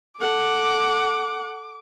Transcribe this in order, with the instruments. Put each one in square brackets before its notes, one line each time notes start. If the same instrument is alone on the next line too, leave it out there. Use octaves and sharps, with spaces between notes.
[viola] A4 F#5 [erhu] D6